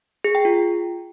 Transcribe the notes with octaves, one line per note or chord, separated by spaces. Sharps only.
G#4
G5
F4